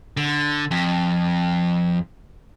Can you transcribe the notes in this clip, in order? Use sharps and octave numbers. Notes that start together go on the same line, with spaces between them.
D3
F2